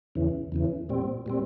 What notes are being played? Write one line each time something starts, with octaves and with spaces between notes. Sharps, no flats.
E2 C#3 E3
E2 C#3 E3
A#2 G3 C4
A#2 G3 C4